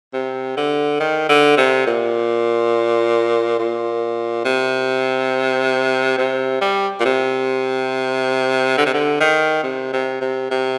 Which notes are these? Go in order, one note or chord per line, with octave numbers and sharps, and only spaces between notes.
C3
D3
D#3
D3
C3
A#2
A#2
C3
C3
G3
A#2
C3
D3
C3
D3
D#3
C3
C3
C3
C3